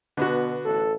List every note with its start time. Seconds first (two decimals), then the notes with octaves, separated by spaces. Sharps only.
0.17 B2 D3 B3 F#4
0.65 A1 A4